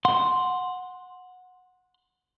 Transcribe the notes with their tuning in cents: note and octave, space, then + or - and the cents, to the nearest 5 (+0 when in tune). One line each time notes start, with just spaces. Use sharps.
F#5 -15 C6 +0